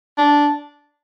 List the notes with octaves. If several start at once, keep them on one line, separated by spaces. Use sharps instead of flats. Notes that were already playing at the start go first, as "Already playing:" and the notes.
D4